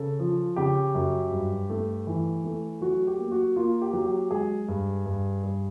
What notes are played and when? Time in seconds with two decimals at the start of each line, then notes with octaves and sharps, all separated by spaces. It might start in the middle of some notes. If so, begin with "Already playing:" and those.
Already playing: C#3 A4
0.19 F3
0.56 C#3 G4
0.94 F#2
1.31 G2
1.70 A3
2.07 E3
2.44 A3
2.81 F#3 F#4
3.07 G4
3.19 A#3
3.32 F#4
3.56 A#3 F4
3.82 G4
3.93 F#3
4.06 G4
4.31 G#3 G#4
4.68 G2
5.06 G2
5.43 G2